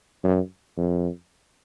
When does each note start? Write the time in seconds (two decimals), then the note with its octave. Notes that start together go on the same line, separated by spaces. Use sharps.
0.24 F#2
0.77 F2